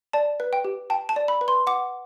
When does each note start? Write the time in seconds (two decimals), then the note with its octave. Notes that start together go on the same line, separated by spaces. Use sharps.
0.13 D5 A5
0.40 B4
0.53 G5
0.65 G4
0.90 G5 A5
1.09 A5
1.16 D5
1.28 B5
1.41 B4
1.48 C6
1.67 F#5 D6